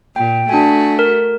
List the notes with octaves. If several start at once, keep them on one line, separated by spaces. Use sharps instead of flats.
A#2 G5
A3 D4 F#4 G#5
A#4